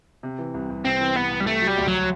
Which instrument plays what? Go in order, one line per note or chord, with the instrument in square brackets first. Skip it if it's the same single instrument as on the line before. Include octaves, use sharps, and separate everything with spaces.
[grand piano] C3
E3
C2
C2
[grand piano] C3 [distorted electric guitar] C4
[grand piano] E3
[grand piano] C2 [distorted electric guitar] B3
[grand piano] C2
[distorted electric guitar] G3
[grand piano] C3 [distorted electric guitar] A3
[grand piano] F#3
[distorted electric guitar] G3
[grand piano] D2
[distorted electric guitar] F#3